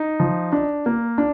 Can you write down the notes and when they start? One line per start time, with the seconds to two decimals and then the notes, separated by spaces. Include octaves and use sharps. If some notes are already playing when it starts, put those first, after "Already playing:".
Already playing: D#4
0.20 F3
0.52 D4
0.86 A#3
1.18 D4